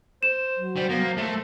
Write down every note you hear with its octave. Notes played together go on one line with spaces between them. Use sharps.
C5 E7
F#3
G3 C5
A#3 B3
C5
A3 A#3 A4